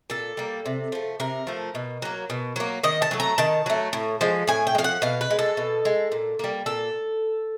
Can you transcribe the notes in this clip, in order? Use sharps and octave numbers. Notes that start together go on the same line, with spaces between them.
A#2 A4
G3 A#3
C3
F3 A3
C3 A#4
F3 A3
B2
F#3 A#3
B2
F#3 A#3
D#3 D#5
A5
F#3 A3
A#5
D#3 A5
F#3 A3
A2
F3 G#3
A2 G#5
G5
G#3
F3 F5
F#5
B2 F5
B4
G#3
A4
B2
G#3
A#2
G3 A#3
A#2 A4